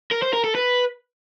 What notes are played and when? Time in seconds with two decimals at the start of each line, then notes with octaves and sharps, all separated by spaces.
0.11 A#4
0.22 C5
0.33 A#4
0.44 A4
0.55 B4